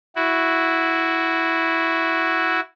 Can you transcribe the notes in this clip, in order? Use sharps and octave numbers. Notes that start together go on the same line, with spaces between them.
E4 F#4